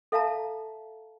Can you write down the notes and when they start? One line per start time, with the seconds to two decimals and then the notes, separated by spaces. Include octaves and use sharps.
0.12 A4 E5 F5 A5 A#5